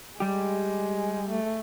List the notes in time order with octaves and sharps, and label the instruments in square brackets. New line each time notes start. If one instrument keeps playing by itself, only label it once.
[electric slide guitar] G3 G4 [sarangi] G#3
[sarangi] A3